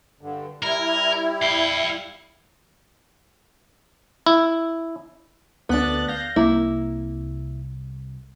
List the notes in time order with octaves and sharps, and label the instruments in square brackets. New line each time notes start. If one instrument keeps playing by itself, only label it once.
[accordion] G2 D3
[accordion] G3 E4 [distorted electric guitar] A#4
[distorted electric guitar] F5 G5
[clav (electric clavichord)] E4
[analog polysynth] D2 F#6 A6 [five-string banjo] B3 D4
[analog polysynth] F5 G6 A#6
[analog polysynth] C2 [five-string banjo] A#3 E4